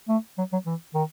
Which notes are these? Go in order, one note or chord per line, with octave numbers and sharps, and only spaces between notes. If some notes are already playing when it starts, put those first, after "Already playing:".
A3
F#3
F#3
E3
D#3